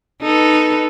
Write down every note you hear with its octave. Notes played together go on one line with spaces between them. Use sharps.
D#4 A4 B4